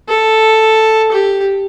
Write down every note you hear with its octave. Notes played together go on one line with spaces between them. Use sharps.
A4
G4